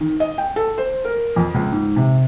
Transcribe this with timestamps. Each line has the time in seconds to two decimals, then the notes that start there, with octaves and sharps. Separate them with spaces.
0.01 D#3
0.20 D#5
0.38 G5
0.56 A4
0.78 C5
1.05 A#4
1.36 F2
1.54 C#2
1.72 G#2
1.96 C3